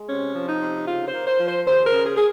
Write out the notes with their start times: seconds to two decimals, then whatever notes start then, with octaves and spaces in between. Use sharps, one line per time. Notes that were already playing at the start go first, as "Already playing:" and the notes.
Already playing: G#3
0.09 C3 C#4
0.35 F3
0.48 D#4
0.61 C3
0.87 C#3 F4
1.07 C5
1.13 A#3
1.27 C5
1.39 F3
1.47 C5
1.66 D#2 C5
1.85 A#4
1.92 C#3
2.05 G#4
2.16 G#4